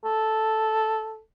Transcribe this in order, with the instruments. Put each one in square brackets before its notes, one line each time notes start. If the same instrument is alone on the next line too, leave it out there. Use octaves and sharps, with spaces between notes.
[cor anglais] A4